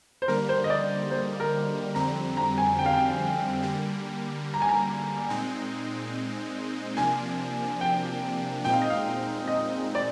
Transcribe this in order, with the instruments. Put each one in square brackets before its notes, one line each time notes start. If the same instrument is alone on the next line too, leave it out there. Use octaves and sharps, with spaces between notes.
[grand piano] C5
[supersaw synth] D3 G3 A#3 [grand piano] A#4
[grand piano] C5
D#5
D5
C5
A#4
[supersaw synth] F2 D3 G3 C4 [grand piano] A#5
[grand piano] A#5
G#5
G5
F5
G5
[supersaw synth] D3 G3 A#3
[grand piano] A#5
G#5
A#5
[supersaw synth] A#2 G#3 C4 D#4
[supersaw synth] C3 F3 A#3 D4 [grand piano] G#5
[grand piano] G5
[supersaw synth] A#2 G#3 C4 D#4 [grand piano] G5
[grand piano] F5
D#5
F5
D#5
D5